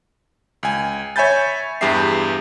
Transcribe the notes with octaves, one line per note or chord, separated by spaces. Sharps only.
C#2 G#5
C#5 E5 G#5 B5 G6 A6
E2 G2 G4 G#4 E5 C7